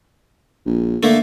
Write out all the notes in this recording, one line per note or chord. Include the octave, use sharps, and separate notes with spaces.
A#1
D3 A3 A#3